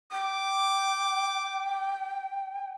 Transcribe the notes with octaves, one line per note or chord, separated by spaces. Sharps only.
G5 D6